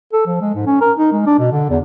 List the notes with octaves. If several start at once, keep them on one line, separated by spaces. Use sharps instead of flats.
A4
F3
G#3
G#2
C#4
A#4
D#4
G#3
D4
B2
D3
E2